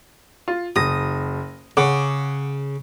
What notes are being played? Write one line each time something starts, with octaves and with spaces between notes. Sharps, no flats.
F4
F#1 D#6 A#6
C#3 F#5 D6